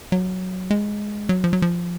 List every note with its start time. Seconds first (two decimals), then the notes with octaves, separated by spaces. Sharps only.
0.12 F#3
0.71 G#3
1.29 F#3
1.44 F3
1.53 F#3
1.62 F3